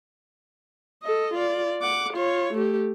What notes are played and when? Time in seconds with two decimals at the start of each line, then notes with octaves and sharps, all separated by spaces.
1.03 A4 D#5
1.33 F4 D5
1.82 F#5 D6
2.13 F4 C#5
2.53 A3 G4